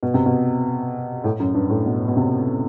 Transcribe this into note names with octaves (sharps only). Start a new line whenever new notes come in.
B2
C3
B2
A2
F#2
G2
A2
B2
B2
C3